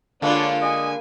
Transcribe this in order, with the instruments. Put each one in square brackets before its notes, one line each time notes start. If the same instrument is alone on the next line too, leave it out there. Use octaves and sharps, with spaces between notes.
[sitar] D3 G#3 [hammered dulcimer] A#3 F5 B5 [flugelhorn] D4 [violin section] F4 C#5
[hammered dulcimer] G4 D6 [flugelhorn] D#5 [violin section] G#5